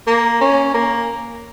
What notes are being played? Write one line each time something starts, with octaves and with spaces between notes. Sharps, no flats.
A#3
C#4
A#3